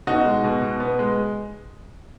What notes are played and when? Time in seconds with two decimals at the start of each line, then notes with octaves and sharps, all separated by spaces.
0.07 B2 D#4 F#4
0.25 G#3
0.44 B2
0.62 B2
0.80 B3
0.99 G#3